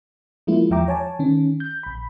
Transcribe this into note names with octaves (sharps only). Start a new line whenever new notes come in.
F3 G#3 A#3 E4 F4
E2 F3 E5 G5 A#5 D6
C#5 G#5 A5
D#3 C#4
G6
A#1 B5